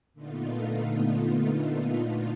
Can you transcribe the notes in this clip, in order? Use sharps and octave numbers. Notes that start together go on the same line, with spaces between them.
A#2 D3 A3 B3 D#4 F4